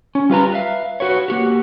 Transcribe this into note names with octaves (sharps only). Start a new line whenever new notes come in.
C#4
G3 F4 B4 A#5
B4 E5 F5
F#4 B4 C#5
A#3 F#4 G4